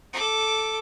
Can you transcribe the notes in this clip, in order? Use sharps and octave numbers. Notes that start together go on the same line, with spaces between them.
A4 D6